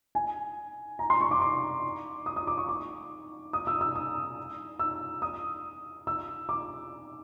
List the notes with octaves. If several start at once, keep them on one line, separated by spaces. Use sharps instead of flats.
G#5
A#5
C6
C#6
D6
D6
D#6
D#6
D6
C#6
D6
D#6
E6
E6
D#6
E6
D#6
E6
D6